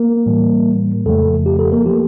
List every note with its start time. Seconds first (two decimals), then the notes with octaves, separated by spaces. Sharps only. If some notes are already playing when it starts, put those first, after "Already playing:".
Already playing: A#3 A#4
0.26 A2 E3 G3
1.06 F2 C#3 F3 A3 A4
1.46 G4
1.59 A4
1.72 A#3 A#4
1.86 F3 A#3 G4